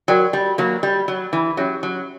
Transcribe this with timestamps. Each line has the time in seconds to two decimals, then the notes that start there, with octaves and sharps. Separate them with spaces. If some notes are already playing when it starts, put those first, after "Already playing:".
0.08 F#3 F#4 A#4 D5 G5
0.33 G3
0.58 F#3 A#3
0.83 G3
1.08 F#3
1.33 E3
1.57 F#3 C#4 G4 C#5 E5
1.83 F#3